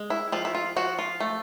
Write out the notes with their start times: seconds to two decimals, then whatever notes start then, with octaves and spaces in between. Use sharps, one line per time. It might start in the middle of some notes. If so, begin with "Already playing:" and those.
Already playing: G#3
0.10 E4
0.32 F3 F4
0.45 E4
0.55 F4
0.76 F3 F#4
0.99 F4
1.20 A3